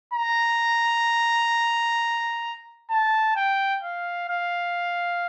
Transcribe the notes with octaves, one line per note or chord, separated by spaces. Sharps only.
A#5
A5
G5
F5
F5